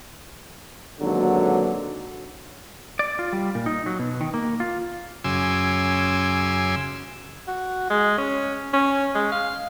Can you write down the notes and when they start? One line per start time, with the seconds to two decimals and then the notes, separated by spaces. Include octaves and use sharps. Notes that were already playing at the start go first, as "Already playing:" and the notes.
1.00 G#1 D#2 B2 D3 F#3
2.99 D5
3.19 F4
3.33 G3
3.55 A#2
3.66 D#4
3.86 F#3
3.99 B2
4.21 D#3
4.34 A#3
4.60 F4
5.24 F#2 C#3 G#5 C6 D6 E6
7.47 F#4
7.90 G#3
8.18 C#4
8.73 C#4
9.15 G#3
9.32 F5